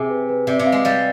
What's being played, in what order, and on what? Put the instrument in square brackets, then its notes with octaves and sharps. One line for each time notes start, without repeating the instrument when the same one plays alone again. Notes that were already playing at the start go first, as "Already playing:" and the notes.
Already playing: [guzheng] C3 [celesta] G#4 G#5
[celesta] B4
B4
[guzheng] C3 [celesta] D5
[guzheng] C3
[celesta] F5
[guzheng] G#3
[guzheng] G3 [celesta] F5